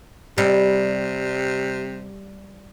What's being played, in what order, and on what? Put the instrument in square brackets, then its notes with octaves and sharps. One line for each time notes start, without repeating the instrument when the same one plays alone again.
[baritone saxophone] C3 [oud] G3